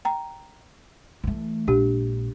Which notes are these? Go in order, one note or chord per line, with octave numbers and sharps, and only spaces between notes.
G5 A#5
E3 A3
A#1 G#3 D4 G4